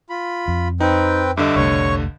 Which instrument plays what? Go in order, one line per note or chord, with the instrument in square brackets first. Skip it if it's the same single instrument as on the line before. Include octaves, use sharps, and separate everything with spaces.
[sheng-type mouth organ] F4 B5
[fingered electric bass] F2
[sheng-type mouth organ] C4 B4 G5 [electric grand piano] D#4
[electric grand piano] G2 D3 D#5 [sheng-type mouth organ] E5 D6
[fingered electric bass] F1 C2 A3 [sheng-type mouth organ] C#5 C#6